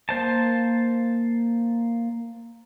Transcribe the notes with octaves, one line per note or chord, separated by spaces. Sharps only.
A#3 C5 A5